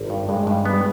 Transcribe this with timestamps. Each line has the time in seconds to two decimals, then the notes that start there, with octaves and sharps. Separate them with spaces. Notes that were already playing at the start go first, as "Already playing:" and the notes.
Already playing: G#1
0.10 G2
0.29 G2 G#3
0.47 G2
0.65 G3 B3
0.73 G#3